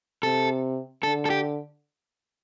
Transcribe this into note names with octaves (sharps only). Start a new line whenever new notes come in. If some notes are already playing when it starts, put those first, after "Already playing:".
C3 A4
D3 A4
A4
G4